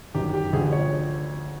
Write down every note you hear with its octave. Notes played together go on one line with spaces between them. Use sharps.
G1 F#2 D#3 G4
G4
D2 D3 F3 G#4
C#5